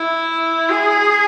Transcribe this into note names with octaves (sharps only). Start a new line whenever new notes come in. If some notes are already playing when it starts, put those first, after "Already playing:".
Already playing: E4
G#4